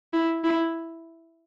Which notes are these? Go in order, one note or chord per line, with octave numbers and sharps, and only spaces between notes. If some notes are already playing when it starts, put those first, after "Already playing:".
E4
E4